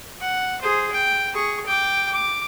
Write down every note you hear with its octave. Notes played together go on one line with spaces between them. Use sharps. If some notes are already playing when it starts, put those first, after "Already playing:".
F#5
G#4 C5
G5
G#4 C#6
G5 D6
D6